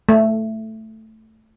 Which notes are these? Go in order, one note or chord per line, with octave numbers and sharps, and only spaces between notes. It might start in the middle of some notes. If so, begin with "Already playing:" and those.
A3